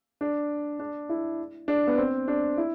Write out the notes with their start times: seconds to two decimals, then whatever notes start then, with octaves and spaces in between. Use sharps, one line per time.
0.21 D4
0.80 D4
1.09 E4
1.68 D4
1.87 B3
1.98 C4
2.28 D4
2.57 E4